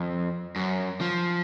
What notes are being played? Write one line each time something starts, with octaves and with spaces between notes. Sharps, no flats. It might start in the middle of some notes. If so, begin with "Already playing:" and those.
Already playing: F2
F#2
F3